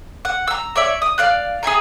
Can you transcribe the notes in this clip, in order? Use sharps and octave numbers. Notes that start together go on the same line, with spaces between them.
F#5
A#5 E6
C#5 D5 E5
D#6
D5 F5 F#6
G#4 E5 G#5 A#5